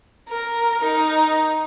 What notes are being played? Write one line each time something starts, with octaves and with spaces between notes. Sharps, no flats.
A#4
D#4